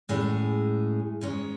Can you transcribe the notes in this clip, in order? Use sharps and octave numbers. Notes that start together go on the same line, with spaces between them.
A2 G#3 C#4 G#4
G#2 G#3 C#4